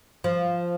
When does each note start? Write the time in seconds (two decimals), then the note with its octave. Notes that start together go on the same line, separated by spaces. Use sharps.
0.24 F3